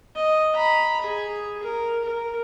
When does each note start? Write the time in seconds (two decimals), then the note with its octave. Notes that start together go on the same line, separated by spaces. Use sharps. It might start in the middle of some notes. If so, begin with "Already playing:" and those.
0.16 D#5
0.56 A#5 B5
1.01 G#4
1.63 A#4
2.04 A#4